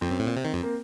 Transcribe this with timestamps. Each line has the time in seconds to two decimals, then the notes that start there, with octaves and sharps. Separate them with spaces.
0.01 F2 C4
0.10 F#2
0.19 A2
0.27 A#2
0.36 C3
0.45 D#3
0.53 F2
0.63 A#3